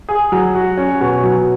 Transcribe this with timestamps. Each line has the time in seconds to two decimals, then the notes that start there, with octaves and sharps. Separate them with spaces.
0.09 G#4
0.32 F#3
0.55 F#4
0.77 C#4
1.01 B2
1.24 F#3